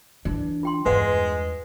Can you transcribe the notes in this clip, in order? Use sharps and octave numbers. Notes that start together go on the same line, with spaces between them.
E3 D4 D5
F4 G5 C6
E2 G2 G#3 B4 D5 F#5